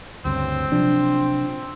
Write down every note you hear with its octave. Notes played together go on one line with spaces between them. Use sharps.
D2 G2 C#3 C4
C3 F3 F#3 D4